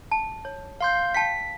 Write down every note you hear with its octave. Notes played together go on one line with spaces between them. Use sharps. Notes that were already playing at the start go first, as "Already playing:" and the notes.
A5
C#5
F5 C6 G6
F5 G5 A5 B6